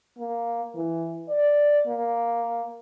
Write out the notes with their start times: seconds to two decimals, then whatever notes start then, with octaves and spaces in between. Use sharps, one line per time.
0.18 A#3
0.75 E3
1.29 D5
1.87 A#3